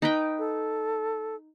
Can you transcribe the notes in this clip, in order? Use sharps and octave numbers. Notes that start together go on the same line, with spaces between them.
D#4 B4 G5
A4